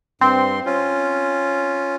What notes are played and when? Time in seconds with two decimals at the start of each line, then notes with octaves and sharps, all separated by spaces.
0.21 G2 C4 C6
0.66 C#4 F4